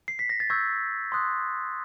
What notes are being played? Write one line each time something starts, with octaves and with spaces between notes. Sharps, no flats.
C7
B6
A#6
A6
C#6 E6 G6 G#6
C6 D#6 F#6